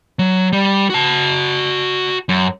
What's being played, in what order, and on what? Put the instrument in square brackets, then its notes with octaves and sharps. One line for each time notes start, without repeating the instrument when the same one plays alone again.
[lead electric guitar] F#3
G3
F#4 A5
F#2